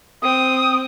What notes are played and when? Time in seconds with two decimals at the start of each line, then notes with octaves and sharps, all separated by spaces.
0.22 C4 D#6